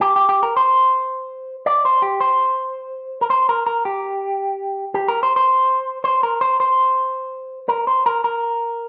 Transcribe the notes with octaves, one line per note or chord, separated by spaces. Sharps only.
G4
G4
G4
A#4
C5
D5
C5
G4
C5
A#4
C5
A#4
A#4
G4
G4
A#4
C5
C5
C5
A#4
C5
C5
A#4
C5
A#4
A#4